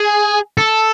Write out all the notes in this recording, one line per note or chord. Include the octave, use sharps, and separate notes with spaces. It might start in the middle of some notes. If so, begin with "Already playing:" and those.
Already playing: G#4
A4